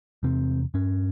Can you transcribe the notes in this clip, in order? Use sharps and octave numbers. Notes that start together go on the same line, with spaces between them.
E2 C3 C4
G2 C#4